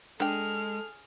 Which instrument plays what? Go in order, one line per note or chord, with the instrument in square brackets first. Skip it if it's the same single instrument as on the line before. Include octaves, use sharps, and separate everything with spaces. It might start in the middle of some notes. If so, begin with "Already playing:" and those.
[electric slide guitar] G#3 [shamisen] D4 G5 [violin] G#4 F6 [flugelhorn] A4